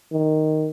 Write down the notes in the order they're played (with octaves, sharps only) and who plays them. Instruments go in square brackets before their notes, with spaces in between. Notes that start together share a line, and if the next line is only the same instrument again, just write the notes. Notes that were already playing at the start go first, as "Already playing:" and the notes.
[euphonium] D#3